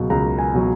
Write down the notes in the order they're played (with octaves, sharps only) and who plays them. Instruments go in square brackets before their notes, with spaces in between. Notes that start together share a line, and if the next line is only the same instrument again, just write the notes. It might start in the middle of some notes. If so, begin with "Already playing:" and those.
Already playing: [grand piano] C#2 B2 F#3
C#2 A#5
G#5
B2 F#3